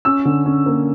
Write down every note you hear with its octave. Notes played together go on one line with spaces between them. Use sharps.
C#4 E6
D3
C#4
A#3